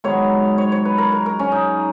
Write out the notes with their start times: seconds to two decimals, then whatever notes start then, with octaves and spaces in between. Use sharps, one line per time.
0.04 G#2 D#3 F#3 B3 C#5
0.58 C#5
0.72 C#5
0.85 B4
0.98 A#4
1.12 A#4
1.26 A#4
1.39 C#4
1.52 D#4